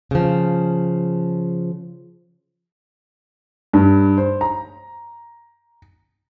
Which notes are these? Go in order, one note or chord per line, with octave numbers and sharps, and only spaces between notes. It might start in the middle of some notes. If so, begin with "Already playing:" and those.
C#3 F3
G2
C5
A#5